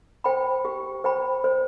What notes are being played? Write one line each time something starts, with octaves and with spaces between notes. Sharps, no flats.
C5 G5 B5
G4
C5 G5 B5
C5